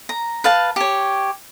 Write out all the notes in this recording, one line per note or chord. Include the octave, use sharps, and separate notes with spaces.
A#5
B4 F5 A5
G4 C#5